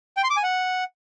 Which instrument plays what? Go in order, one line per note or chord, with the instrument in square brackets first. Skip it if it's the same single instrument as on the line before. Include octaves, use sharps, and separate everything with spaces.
[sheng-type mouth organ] G5
C6
D6
G#5
F#5